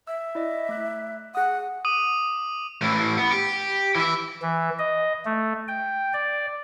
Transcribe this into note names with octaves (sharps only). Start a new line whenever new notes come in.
E5 E6
E4 D5 D#5
A3 F#6
G#4 F#5 D#6
D6 D#6 D#7 F#7
A2 E3
B3
G4
E3 E5
E3
D#5
A3
G5
D5